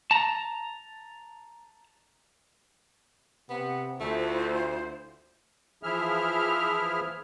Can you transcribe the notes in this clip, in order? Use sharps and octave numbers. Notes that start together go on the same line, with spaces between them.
A5 A#5
C3 B3 F#5
D2 A3 E4 F4 C5
E3 F3 E4 G#4 E5 F6